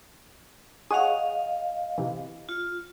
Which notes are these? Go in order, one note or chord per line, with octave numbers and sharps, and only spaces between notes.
G#4 C#5 D#5 F5 F#5
C3 E3
F4